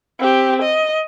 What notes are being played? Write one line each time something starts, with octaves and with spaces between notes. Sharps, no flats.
C4 G4
D#5